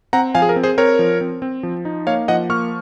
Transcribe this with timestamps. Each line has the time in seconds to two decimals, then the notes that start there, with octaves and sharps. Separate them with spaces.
0.13 C4 F#5 A#5
0.35 F3 F5 G#5
0.42 G#4
0.49 A#4
0.56 C4
0.63 G#4 C5
0.78 C4 A#4 C#5
0.99 F3
1.21 C4
1.42 C4
1.63 F3
1.85 D#4
2.07 A#3 C#5 F5
2.28 F3 D#5 F#5
2.50 A#3 C#6 F6